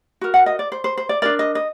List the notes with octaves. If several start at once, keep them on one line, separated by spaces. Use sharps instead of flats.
F#4 A#4
F#5
D#5
D5
C5
C5
C5
D5
D4 F#4 A#4 D5
D#5
D#5